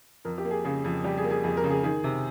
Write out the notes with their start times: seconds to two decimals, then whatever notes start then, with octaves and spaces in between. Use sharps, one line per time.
0.25 F2 A#4
0.38 G4
0.45 A#3
0.51 G#4
0.64 C#3 G#4
0.84 F2
1.04 G3 G4
1.17 G#4
1.24 A#3
1.30 G#4
1.44 F2 G#4
1.57 A#4
1.64 C#3
1.70 G#4
1.84 D#3 G#4
2.04 C3